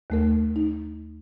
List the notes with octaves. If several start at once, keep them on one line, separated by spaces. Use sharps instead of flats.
D#2 A3 A#4
D#4